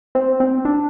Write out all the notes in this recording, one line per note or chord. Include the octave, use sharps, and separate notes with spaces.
C4
C4
D4